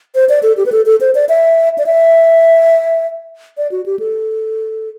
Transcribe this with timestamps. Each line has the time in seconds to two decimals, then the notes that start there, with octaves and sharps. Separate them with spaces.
0.15 C5
0.29 D5
0.43 A4
0.57 G4
0.66 B4
0.72 A4
0.86 A4
1.01 C5
1.15 D5
1.29 E5
1.78 D5
1.86 E5
3.57 D5
3.72 F#4
3.86 G4
3.99 A4